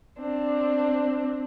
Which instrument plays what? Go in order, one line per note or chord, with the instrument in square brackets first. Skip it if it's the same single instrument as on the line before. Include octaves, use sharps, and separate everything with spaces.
[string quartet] C4 D4